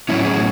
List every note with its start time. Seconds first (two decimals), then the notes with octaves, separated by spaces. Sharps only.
0.09 A2 F#3 A3 C#4 E4
0.25 G#4